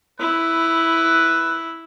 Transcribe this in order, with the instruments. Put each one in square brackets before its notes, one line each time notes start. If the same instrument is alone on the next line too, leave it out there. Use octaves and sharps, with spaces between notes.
[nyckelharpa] E4 [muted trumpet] B4